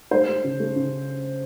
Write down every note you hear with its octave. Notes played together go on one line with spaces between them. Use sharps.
A3 C5
A3
C#3
A3
C#3